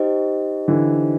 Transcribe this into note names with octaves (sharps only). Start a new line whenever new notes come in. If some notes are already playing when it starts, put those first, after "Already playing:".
Already playing: D#4 G4 C5 D#5 G5
D3 E3